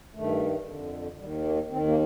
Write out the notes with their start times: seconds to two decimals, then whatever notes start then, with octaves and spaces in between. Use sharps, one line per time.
0.14 G2 D#3 A3
0.66 F2 D3
1.18 D#2 D#3 G3
1.44 A#3
1.70 D#3 C4
1.73 D#2
1.88 A#3